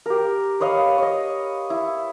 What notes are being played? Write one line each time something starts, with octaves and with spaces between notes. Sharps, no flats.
G4 A#4
B4 C#5 D#5 F5
C#5 D#5
E4